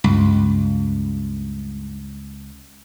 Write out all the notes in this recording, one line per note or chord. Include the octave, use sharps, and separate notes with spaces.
C#2 G2